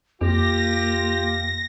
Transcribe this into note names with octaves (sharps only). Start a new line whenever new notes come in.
F2 A#3 F4 G4 A#6